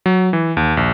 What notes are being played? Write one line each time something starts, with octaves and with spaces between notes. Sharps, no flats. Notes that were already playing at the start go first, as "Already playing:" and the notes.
F#3
E3
D#2
A#1